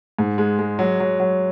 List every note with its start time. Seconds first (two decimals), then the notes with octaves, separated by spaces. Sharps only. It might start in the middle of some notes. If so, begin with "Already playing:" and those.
0.19 G#2
0.38 G#3
0.59 G#3
0.79 F#3
1.00 F#3
1.20 F#3